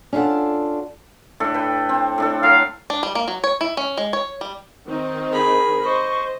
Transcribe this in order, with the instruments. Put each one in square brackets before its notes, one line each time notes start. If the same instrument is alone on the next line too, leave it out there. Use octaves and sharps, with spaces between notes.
[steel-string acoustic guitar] C#4 D4 F4 A4 F#5
[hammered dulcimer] A2 D4 A4
B4 G5
C4
A2 D4 A4
[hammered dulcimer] F#3 A4 [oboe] F5
[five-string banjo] D4
G3
A#3
F#3
C#5
E4
C#4
G#3
C#5
G3
[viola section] D#3 C4 D#4
[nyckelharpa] G#4 B5 [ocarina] A#4
[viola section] C5 [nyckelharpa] D#5 [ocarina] C#6